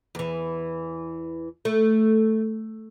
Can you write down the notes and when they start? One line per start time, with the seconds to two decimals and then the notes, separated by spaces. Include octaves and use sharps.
0.15 E2 E3
1.65 A3